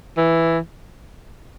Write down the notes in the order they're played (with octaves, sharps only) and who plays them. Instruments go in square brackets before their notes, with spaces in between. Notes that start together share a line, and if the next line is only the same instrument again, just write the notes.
[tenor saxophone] E3